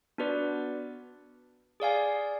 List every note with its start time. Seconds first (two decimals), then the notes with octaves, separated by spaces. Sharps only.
0.18 B3 D4 F#4 B4 D5
1.80 G#4 D5 F5 G#5